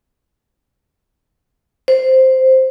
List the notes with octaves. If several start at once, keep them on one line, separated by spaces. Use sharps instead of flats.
C5